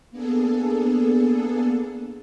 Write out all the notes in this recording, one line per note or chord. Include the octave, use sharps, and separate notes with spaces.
A#3 B3 D4 G#4 A4